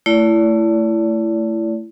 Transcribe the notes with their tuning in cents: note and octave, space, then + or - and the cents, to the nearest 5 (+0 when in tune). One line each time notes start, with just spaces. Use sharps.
A3 +10 E4 +20 D5 -40